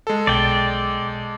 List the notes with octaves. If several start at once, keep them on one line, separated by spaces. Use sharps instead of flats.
G#3 A4
B1 D5 G5